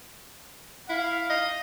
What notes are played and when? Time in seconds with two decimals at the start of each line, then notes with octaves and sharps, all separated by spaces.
0.89 E4 F5
1.30 D#5